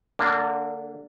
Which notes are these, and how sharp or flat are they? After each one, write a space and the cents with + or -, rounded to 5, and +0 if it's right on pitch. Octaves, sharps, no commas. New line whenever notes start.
D3 +0 A#3 -30 D4 -20